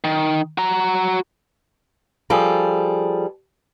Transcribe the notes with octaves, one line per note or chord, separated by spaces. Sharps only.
D#3
F#4 A#5
F3 G3 G#4 A4